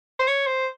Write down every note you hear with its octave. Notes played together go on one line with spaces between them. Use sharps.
C5
C#5
C5